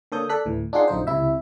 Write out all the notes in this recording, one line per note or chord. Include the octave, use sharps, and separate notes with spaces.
D3 A#3 A4 C#5 D#6 G6
A4 D5 F#6 B6
D2 A2 E3
D4 D#4 F4 G#4 F#5 C6
A#1 F#2 D3 D#4 F4 C5
C#2 C3 E4 E5